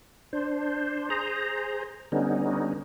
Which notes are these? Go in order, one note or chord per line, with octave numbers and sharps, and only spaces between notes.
D4 C5
G#4 C5 A#5
D3 G3 B3 C#4 D#4